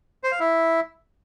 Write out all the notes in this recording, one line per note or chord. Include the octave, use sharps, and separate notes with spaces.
C5
F5
E4